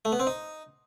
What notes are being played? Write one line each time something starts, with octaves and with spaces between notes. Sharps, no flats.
A3
B3
C4
D#4